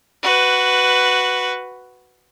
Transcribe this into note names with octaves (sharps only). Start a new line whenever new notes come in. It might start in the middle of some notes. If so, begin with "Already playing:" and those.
F#4 B4